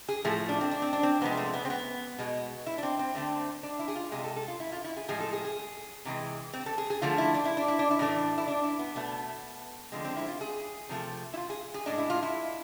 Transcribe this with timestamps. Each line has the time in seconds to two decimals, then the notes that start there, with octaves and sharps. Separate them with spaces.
0.09 G#4
0.25 A2 F3 A3 G#4
0.49 D4
0.61 C4
0.71 D4
0.82 C4
0.93 D4
1.03 C4
1.22 C3 F3 G#3 B3
1.37 A3
1.54 B3
1.65 C4
1.70 B3
2.19 B2 G#3
2.66 E4
2.78 D4
2.83 C4
2.99 C4
3.15 D3 A3 C4
3.63 D4
3.79 E4
3.88 G#4
3.96 F4
4.12 C3 G#3 G#4
4.24 A4
4.36 A4
4.48 F4
4.60 E4
4.72 F4
4.84 E4
4.97 G#4
5.08 A2 F3 G#3 G#4
5.20 A4
5.33 G#4
5.45 G#4
6.05 C3 E3 G#3
6.53 C4
6.66 A4
6.78 G#4
6.90 G#4
7.02 D3 F3 A3 F4
7.18 E4
7.34 D4
7.45 E4
7.57 D4
7.68 E4
7.79 D4
7.91 E4
7.99 A2 E3 A3 D4
8.38 E4
8.48 D4
8.63 E4
8.79 B3
8.96 B2 A3 B3
9.92 D3 F3 G#3 C4
10.05 C4
10.16 E4
10.28 F4
10.41 G#4
10.89 C3 F3 A3
11.34 E4
11.37 F4
11.50 G#4
11.74 G#4
11.86 A2 G#3 D4
11.98 E4
12.10 F4
12.23 E4